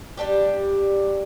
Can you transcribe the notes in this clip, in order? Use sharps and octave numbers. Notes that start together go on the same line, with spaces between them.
G3 D4 G4